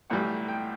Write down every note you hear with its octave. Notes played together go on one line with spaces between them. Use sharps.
B1 A2 E3 G3 F#5
G5